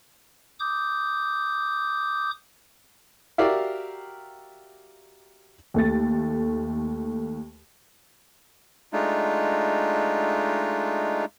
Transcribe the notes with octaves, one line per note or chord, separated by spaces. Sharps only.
D6 D#6 G6
F#4 G4 A#4 D5 E5 F5
D#2 A3 A6
G#3 A3 D4 D#4 F4